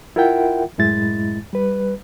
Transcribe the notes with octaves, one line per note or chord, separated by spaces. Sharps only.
E4 F4 A#4 E5 F#5 G5
F#2 A2 G#3 E4 A6
G3 B4